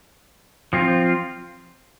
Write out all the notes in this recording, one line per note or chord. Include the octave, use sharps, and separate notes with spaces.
F3 C4 F4